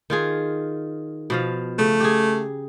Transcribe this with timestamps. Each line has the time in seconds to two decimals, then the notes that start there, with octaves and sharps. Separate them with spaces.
0.10 D#3 F4 G#4
1.30 B2 F3 F5
1.79 C#3 A3
2.00 G4 G#4